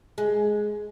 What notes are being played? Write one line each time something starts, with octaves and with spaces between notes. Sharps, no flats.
G#3